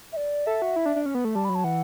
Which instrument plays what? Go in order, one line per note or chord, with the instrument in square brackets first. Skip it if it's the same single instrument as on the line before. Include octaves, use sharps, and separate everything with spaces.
[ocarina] E5
D5
[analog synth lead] A4 [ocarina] E5
[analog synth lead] F#4
E4
D4
D4
C#4
B3
A3
[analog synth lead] G3 [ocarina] A5
[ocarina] B5
[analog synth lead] F#3
[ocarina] A5
[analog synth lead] E3 [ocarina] F#5